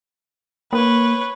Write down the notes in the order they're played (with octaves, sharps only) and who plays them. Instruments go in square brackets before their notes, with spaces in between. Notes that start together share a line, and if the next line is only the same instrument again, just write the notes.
[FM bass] A#3 [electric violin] B4 C#5